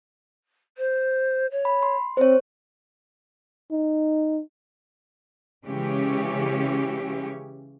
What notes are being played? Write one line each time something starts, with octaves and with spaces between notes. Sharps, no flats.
C5
C#5
B5
C6
C4 C5 C#5
D#4
C#3 E3 G#3 C#4 G4